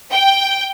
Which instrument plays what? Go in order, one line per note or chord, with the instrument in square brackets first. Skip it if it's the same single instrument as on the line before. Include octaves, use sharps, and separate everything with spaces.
[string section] G5